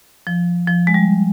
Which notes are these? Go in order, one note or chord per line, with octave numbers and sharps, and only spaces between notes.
F3
F3
G#3
G3